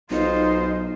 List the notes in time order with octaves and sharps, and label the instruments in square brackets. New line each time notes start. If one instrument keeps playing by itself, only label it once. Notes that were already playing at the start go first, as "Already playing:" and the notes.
[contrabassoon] B1 [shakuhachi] D#4 [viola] F4 C5